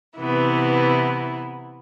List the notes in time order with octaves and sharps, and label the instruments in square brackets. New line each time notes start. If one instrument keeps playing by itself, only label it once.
[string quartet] C3 E3 B3 E4